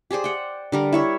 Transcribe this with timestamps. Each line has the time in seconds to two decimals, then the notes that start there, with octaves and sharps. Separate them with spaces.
0.11 G4 G#4 C5 D5
0.24 F#5 G5
0.72 D3 G3 A#4
0.93 E4 C#5 E5